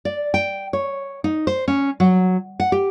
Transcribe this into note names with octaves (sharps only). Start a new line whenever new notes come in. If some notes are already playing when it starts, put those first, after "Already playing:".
D5
G5
C#5
D#4
C5
C#4
F#3
F#5
G4